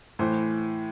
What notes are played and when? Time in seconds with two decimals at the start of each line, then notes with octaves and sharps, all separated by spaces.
0.19 A2 E3 C5